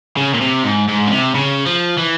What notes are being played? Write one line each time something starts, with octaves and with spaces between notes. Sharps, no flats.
C#3
A#2
C3
G#2
G#2
C#3
C3
C#3
F3
E3